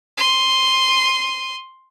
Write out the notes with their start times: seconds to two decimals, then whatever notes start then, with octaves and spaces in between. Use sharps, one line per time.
0.17 C6 D#7